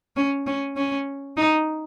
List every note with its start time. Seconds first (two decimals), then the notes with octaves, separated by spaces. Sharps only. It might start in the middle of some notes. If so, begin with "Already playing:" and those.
0.16 C#4
0.47 C#4
0.76 C#4
1.37 D#4